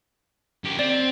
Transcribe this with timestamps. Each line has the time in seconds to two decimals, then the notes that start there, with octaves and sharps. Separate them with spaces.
0.64 F#2 G4
0.79 C4 D5